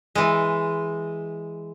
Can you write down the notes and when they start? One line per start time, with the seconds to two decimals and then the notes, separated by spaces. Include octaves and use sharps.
0.15 E3 G#3